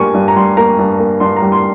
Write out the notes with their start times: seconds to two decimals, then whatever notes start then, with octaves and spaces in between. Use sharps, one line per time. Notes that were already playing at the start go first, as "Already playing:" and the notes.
Already playing: G2 G3 A#3 G#5 C#6
0.14 G2
0.28 A#5
0.36 G3 C6
0.57 A#3 A#5
0.79 G2
0.99 A#3
1.20 G2 C6
1.36 A#5
1.42 G3
1.52 C6